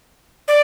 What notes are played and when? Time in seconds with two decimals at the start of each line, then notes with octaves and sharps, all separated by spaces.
0.48 D5